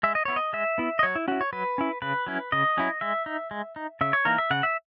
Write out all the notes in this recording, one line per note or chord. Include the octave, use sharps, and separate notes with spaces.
G#3 E5
D#5
B3 E4 C#5
D#5
G#3 E5
B3 E4
D#5
F#3 C#5
E4
C#4 E4 F#4
C#5
F#3 B4
C#4 E4
C#3 B4
F#3 C#4 E4
C#3 D#5
F#3 C#4 E4
G#3 E5
D#4
G#3
D#4
C#3 E5
C#5
E3 A#3 D#4 A#4
E5
C#3 F#5
E5